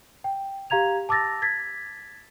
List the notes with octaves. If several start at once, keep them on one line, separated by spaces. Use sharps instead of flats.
G5
G4 F5 A#5 G#6 F7
A5 D6 E6 A6 A#6
G#6 A6 B6